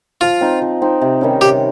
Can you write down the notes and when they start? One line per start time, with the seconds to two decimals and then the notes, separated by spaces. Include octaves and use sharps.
0.21 F3 F4
0.41 C4 D#4
0.61 F3
0.82 C4 D#4
1.02 C3
1.21 D#3 G3 C#4
1.41 C3 G4